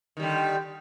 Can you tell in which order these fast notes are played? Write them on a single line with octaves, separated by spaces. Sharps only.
D#3 G3 D3